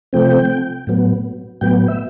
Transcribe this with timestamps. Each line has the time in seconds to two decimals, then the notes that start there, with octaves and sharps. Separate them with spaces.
0.13 C3 F3 A3 C4 G5
0.87 A2 F#3 B3
1.61 A2 F#3 B3 G5
1.88 E5